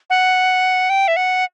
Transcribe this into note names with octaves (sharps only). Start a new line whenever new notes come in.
F#5
G5
E5
F#5